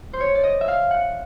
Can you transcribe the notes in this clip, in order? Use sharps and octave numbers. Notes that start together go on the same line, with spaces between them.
C5
C#5
D5
D#5
E5
F5
F#5